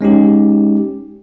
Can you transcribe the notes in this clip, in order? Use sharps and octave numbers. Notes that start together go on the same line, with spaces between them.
G#3 C#4 D#4 G4